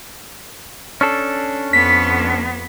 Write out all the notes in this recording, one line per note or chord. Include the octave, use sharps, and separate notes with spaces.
C#4 D4 A4
F2 B3 B6